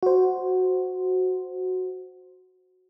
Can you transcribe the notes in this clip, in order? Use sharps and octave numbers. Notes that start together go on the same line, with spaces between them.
F#4 C5